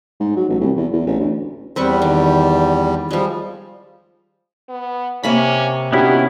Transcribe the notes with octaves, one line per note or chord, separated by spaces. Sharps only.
G#2
F#3
A1
C2
E2
E2
A1
D2
E2 G3 C4 B4 C#6
D#3
F3 G3 G#3
B3
C3 A#3 C#4 B5
D#3 B3 C#4 D4 E4 F#4 G4